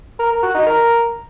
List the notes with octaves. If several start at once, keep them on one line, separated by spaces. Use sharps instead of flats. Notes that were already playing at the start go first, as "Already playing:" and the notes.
A#4
A#4
F#4
D#4
A#4